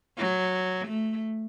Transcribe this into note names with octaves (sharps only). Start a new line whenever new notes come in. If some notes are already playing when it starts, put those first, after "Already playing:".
F#3
A3